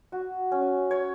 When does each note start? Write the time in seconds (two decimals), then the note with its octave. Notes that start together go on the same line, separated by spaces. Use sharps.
0.12 F#4
0.52 C#4
0.91 C#5